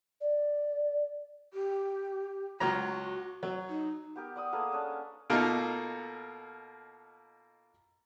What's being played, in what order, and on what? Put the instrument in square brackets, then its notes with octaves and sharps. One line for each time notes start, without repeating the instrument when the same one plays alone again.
[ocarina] D5
[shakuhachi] G4
[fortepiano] C#2 F#3 A#5 [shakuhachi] F#4
[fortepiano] F#3
[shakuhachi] D#4
[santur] B3 G4 A#4
D5 F#5 D#6 E6
A#3 G#4 A4 B4
C#4 D4
[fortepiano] B2 A3 A#3 D#4 F4 A4